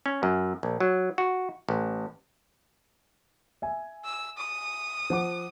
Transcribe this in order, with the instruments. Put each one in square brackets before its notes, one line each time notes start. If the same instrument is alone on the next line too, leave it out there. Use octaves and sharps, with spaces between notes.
[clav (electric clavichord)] C#4
F#2
A#1
F#3
F#4
A1
[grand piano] E5 G#5
[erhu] E6
D#6
[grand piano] F3 F#5 D6